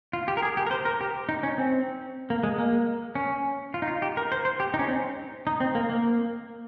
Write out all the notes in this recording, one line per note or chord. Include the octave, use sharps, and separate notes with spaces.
F4
G4
A#4
G#4
G4
A#4
C5
A#4
G4
D#4
C#4
C4
A#3
G#3
A#3
C#4
F4
D#4
F4
G4
A#4
C5
C5
G4
D#4
C#4
C4
D#4
C4
A#3
A#3